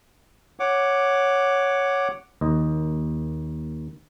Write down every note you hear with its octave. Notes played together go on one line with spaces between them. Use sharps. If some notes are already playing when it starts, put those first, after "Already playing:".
C#5 F#5 D6
D#2 D#5